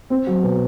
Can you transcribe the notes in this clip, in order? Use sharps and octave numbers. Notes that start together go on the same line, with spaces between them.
C4
F#3
B2